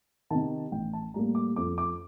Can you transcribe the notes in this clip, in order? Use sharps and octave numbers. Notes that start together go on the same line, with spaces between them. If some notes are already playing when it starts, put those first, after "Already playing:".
C3 D#3 A5
A1 G5
A5
A2 G3 A#3 A#5
D6
F2 D6
D6